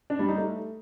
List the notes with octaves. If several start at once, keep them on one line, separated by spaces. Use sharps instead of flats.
D4
G3
D#4
A3